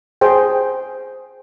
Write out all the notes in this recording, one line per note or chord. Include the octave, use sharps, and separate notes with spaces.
G#4 C5 G5